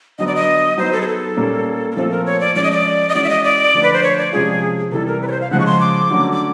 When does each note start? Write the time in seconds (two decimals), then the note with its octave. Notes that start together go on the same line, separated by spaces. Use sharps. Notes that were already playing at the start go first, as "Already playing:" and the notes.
0.19 D3 F#3 B3 D#5
0.27 D5
0.35 D#5
0.78 F#3 B3 D#4 C5
0.93 A4
1.02 G#4
1.08 A4
1.37 A#2 G3 A#3 C#4
1.91 A#4
1.96 A#2 F3 A3 C4 F4 A4
2.11 A#4
2.26 C#5
2.40 D5
2.55 F3 G#3 C#4 D5
2.64 D#5
2.72 D5
3.09 D#5
3.15 E3 G#3 C#4 F#4 D5
3.24 E5
3.30 D#5
3.44 D5
3.74 D3 F3 A3
3.83 B4
3.93 C5
4.03 C#5
4.18 D5
4.32 C3 F3 G#3 C#4 F4 G#4
4.92 C3 E3 G3 A4
5.07 A#4
5.22 B4
5.28 C#5
5.32 C5
5.41 F5
5.51 C#3 F3 G#3 F#5
5.60 C#6
5.66 C6
5.80 D6
6.10 D3 F#3 A3 C#4 F#4
6.32 D6